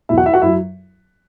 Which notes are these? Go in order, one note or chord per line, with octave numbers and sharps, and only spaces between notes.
E2 B2 F#3 E4 E5
F#4 F#5
E4 E5
F#4 F#5
F#2 F#3 E4 E5